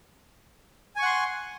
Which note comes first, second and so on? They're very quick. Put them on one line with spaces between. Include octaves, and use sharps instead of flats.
G#5 C#6 F#5 C6